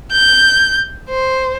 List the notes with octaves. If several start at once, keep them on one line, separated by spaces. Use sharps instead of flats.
G6
C5